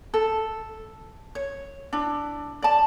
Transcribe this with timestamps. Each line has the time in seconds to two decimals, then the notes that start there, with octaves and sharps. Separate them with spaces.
0.14 A4
1.35 C#5
1.93 D4 E4
2.62 D5 A5